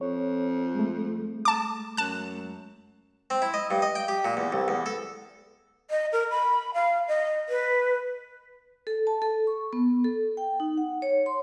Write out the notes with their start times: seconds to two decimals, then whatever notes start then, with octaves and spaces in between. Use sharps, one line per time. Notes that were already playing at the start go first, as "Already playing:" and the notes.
0.01 F2 C#5
0.75 G#3 A3
1.45 A5 D6
1.97 F#2 A5 F#6
3.30 C4
3.42 E4
3.54 D#5
3.71 G2
3.82 D#5
3.95 G5
4.08 G4
4.25 A#2
4.37 E2
4.52 C2
4.68 E2
4.86 A4
5.91 D#5
6.13 A#4
6.31 B5
6.74 F5
7.08 D#5
7.49 B4
8.87 A4
9.07 A5
9.22 A4
9.47 C#6
9.73 B3
10.04 A4
10.37 G5
10.60 D#4
10.77 F#5
11.02 C#5
11.26 C6